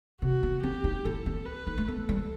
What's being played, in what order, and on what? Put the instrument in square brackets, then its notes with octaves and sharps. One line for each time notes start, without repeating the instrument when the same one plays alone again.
[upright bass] C3 [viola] F#4
[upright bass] B3
[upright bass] C4 [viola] G4
[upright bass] D#4
[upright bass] E4 [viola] A4
[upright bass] C4
[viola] B4
[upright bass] D#4
A3
[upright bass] B3 [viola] A4
[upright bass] G3